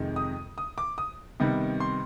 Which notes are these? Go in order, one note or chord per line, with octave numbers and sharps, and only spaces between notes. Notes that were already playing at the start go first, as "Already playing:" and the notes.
Already playing: F2 C3 D#3 G#3
D#6
D#6
D6
D#6
C3 D#3 G3 B3
C6